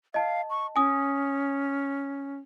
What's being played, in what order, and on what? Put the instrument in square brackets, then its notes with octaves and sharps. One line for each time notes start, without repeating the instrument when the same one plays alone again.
[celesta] D#5 A5 [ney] F5
[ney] C#6
[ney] C#4 [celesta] G#5 D#6